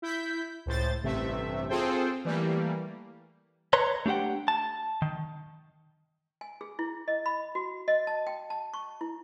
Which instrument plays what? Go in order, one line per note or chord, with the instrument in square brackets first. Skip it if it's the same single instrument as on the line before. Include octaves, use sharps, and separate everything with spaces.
[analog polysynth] E4 G6 B6
C#2 A2 C5 A6
A1 G2 C3 A3 E5
C4 F4 G#4 A4 C5 G5
E3 G3 A3 A#3
[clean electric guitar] B4 C#5 A#5 C6
A3 D4 G4 F#5 G5
A5
D#3
[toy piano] G#5
G#4
E4
D#5
B5
F#4
D#5
A5
G5
A5
C#6
E4